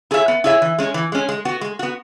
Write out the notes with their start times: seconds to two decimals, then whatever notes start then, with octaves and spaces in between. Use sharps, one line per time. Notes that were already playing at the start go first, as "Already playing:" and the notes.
0.11 E4 G#4 C#5 E5
0.28 B3
0.44 E4 G#4 C#5 E5
0.62 E3
0.78 G#3 C#4
0.94 E3
1.12 G#3 C#4
1.29 G#3
1.45 B3 F#4
1.61 G#3
1.79 B3 F#4